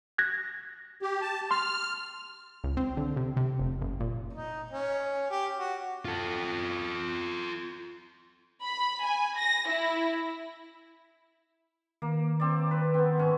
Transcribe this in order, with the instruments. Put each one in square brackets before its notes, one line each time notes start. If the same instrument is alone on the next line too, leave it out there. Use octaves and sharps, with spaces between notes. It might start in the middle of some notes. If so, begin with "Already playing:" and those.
[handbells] F#6 G#6 A#6
[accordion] G4
A5
[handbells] C6 [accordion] F6
[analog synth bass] C#2
C4
D3
C3
C3
F1
F#1
A#2
[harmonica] D#4
C#4
G4
F#4
[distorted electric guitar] F4 A4
[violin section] B5
G#5
A#6
E4
[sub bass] D#3 [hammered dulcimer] A#3
[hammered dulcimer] C4 D5
B4
B3 C4
G#2 C#4